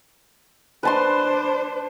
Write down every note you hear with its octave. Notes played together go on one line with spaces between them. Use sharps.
D4 B4 C5 A5 C6